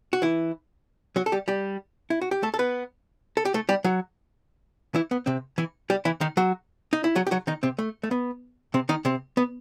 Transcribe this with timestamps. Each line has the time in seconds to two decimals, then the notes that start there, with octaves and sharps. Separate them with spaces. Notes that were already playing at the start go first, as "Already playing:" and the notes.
0.13 F#4
0.22 E3 E4
1.16 F#3 F#4
1.26 A4
1.32 G3 G4
1.48 G3 G4
2.10 E4
2.21 F#4
2.31 G4
2.43 A3 A4
2.54 A4
2.59 B3 B4
3.37 A4
3.45 G4
3.54 A3 A4
3.69 G3 G4
3.84 F#3 F#4
4.95 E3 E4
5.11 B3
5.26 C3 C4
5.58 E3 E4
5.90 G3 G4
6.05 E3 E4
6.21 D#3 D#4
6.37 F#3 F#4
6.93 D#4
7.04 E4
7.15 F#3 F#4
7.27 G4
7.31 F#3 F#4
7.47 D#3 D#4
7.63 C3 C4
7.79 A3
8.03 A3
8.11 B3
8.74 C3 C4
8.89 D#3 D#4
9.05 C3 C4
9.37 B3